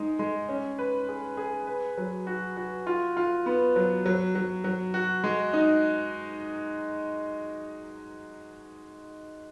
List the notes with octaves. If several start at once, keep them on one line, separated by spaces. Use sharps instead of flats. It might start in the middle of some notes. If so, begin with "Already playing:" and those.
Already playing: G#3 D#4
G#3
C#4
B4
G#4
G#4
B4
F#3
F#4
F#4
F4
F4
B3
F#3
F#3
F#3
F#3
F#4
G#3
D#4